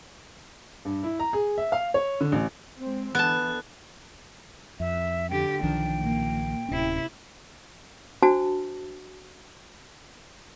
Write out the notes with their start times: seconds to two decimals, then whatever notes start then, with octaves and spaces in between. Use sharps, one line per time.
0.85 G2
1.03 E4
1.20 A#5
1.33 G#4
1.58 E5
1.72 F5
1.94 C#5
2.21 D3
2.32 A1
2.78 G#3 C4
3.15 D3 E3 B3 A5 F#6
4.80 F2 E5
5.30 D3 G4 G5
5.63 B1 D#3 F3 D4
5.99 A#2 A#3
6.69 D1 C3 C#4 E4
8.22 D4 F#4 C5 A5